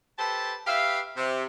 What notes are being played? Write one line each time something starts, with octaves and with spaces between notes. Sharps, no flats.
G4 A4 B4 C5 A5
G4 B4 E5 F5
C3